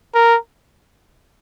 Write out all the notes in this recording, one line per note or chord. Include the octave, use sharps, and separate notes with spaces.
A#4